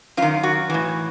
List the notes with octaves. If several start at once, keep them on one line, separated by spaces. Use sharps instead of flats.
F#2 F4
D#3
F#4
A2 E3 F#4